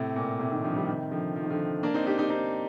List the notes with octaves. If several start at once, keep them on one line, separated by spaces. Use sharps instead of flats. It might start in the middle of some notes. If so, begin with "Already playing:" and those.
Already playing: A2 C3
A#2
A2 C3
C3 D#3
D3 F3
D#3 G3
C3 D#3
D3 F3
F3
D#3
D3 F3
A#3 D4
C4 D#4
D#4 G4
D#4 G4
C4 D#4